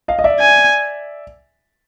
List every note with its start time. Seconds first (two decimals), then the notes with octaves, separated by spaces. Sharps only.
0.08 D#5 F5
0.19 D#5
0.24 D5 E5
0.40 G#5